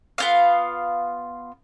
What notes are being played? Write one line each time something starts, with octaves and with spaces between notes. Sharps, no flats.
B3 F4 F5